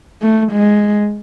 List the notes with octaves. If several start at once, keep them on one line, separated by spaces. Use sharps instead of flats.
A3
G#3